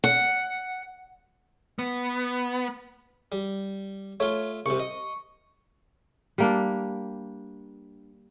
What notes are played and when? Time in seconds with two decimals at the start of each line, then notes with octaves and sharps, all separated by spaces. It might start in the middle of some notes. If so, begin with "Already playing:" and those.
0.04 F#5
1.79 B3
3.32 G3
4.20 A3 F4 C#5
4.66 C2 C3 C#6
4.80 D#5
6.38 G3 A#3 D4